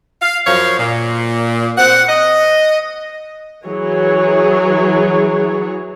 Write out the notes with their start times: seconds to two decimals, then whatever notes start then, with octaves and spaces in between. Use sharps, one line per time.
0.22 F5
0.46 F#2 F3 C#5 F5
0.78 A#2
1.78 C4 F#5
2.08 D#5
3.64 E3 F#3 G#4 C#5